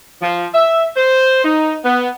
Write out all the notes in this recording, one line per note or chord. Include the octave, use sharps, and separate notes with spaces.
F3
E5
C5
D#4
B3